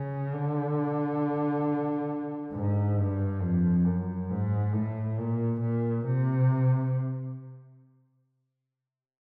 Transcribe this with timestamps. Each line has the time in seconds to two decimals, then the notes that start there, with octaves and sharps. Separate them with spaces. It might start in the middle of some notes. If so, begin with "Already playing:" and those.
Already playing: C#3
0.33 D3
2.53 G#2
2.97 G2
3.42 F2
3.85 F#2
4.29 G#2
4.73 A2
5.17 A#2
5.60 A#2
6.05 C3